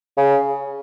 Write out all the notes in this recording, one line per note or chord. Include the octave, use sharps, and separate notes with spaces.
C#3